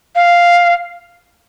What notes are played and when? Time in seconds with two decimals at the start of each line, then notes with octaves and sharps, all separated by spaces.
0.15 F5